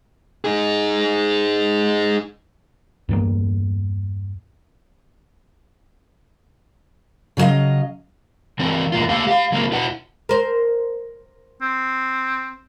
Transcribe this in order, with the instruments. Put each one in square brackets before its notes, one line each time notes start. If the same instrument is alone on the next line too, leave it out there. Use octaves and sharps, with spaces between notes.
[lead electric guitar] D#4 G#4
[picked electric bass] E2 G2 A#3
[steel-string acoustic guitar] C#3 F#3 B4 D#5 F5
[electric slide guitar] E3 C4 A#4
E2 A#3 F4
A3 A#3 G4 F5
G4 F5
F#3 A#3 C4
E4 F#4 B4 F#5
[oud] A#4 C5
[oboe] C4